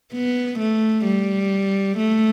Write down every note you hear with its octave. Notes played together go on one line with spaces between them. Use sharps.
B3
A3
G3
A3